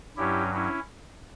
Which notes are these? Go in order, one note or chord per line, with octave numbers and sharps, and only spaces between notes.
G2 F#3 C#4 E4 G4
C#4 E4